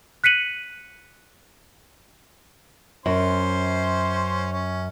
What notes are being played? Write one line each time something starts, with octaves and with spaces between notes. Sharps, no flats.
F#6 B6 C#7 D#7 F#7
F#2 C#4 C5 C6
C#4